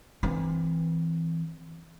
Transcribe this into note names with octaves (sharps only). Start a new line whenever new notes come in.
E3 C4